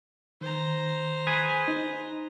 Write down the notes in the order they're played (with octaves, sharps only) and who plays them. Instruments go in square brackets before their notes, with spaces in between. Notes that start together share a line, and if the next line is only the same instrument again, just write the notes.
[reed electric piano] D#3 [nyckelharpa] C5 A#5
[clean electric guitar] G#4 B4 G#5
[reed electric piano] D#4